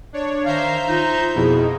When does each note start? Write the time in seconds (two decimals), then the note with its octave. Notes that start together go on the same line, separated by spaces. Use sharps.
0.13 D4 C#5
0.45 D#3 C5 E5 F5 A#5 G6
0.88 D#4 F4
1.35 F2 B2 D#4 E4 G#4